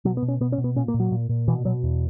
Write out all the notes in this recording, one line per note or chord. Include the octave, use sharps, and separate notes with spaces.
B2 F#3
B3
B2
C#4
B2 B3
C#4
B2
B3
A#2 C#4
A#3
A#2
F#3
A#2
A#2
B2 E3
B2 F#3
E2